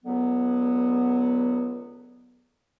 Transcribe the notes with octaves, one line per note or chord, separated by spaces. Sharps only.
C#2 D3 F#3 B3